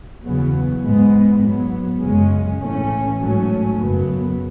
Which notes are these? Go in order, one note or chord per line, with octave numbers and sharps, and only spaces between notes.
E2 C#3 F#3 B3
G#2 G#3 B3
G#2 F#3 B3
F#2 C#3 G#3 C#4
A2 E3 A3 C#4
G#2 F#3 A3 C#4
F#2 C#3 F#3 B3